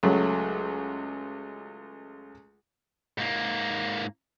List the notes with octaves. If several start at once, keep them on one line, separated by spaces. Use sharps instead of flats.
C#2 F#3 A3
G#2 A#3